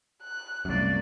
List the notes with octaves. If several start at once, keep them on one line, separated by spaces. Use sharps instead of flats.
F#6
C2 F#2 A3 A#3 D5